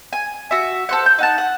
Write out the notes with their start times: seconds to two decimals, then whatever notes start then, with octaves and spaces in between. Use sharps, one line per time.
0.13 G#5
0.51 F#4 E5
0.89 A4 C5 F#5
1.06 G6
1.19 D#4 F#5 A5
1.38 F#5